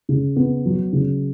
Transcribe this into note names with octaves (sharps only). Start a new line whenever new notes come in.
C#3
B3
F#3
C#3